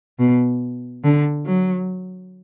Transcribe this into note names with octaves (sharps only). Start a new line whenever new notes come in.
B2
D3
F#3